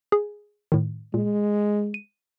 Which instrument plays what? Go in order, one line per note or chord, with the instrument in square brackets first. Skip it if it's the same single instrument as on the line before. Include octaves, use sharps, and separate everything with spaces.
[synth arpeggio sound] G#4
A2 D#3
[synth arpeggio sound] A#2 [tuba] G#3
[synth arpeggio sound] D#7